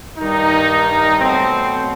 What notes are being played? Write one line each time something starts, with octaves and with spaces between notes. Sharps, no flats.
G2 D#3 G3 D#4
B2 F#3 A3 C4